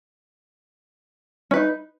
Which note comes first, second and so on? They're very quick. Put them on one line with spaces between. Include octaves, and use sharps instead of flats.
C#4 B4 D#4